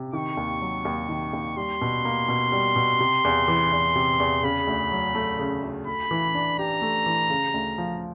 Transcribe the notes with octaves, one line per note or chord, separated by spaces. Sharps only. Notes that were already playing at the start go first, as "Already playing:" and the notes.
Already playing: C3
D#3 C#6
D#2
F#3
D#2
D#3
D#2
G3 C6
B2
A#3
B2
G3
B2
C3
E2
E3
E2
C3
E2
C#3 B5
D2
F#3
A3
C#3
D2
A3 B5
E3
D4
G4 A#5
A3
E3
C#3
D2
F3